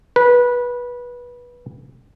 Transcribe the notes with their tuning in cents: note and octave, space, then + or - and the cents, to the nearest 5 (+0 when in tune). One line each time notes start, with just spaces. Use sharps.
B4 -20